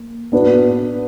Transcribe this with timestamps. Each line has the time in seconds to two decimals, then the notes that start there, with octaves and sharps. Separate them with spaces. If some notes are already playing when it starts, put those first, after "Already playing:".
Already playing: A#3
0.32 B3 D4 F#4 B4